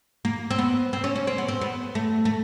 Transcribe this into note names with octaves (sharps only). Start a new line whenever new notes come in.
A#3
C4
B3
C4
C#4
C#4
C4
B3
C4
B3
A3
A3